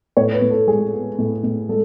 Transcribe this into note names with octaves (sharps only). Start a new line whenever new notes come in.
A2 C#5
B4
A2
A4
G#3 G#4
B3
A2
A2
G#3 A4